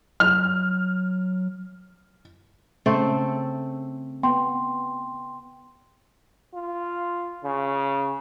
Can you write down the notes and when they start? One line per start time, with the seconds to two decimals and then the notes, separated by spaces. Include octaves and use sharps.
0.20 F#3 F6
2.86 C#3 A3 C4 C#4 A4
4.23 B3 G5 C6
6.54 F4
7.44 C#3